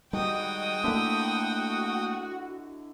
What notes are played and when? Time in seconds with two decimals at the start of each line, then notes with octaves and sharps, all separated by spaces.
0.13 D#3 G3 G#3 D#4 F#4 G5 D#6
0.84 D3 A3 A#3 E4 F#4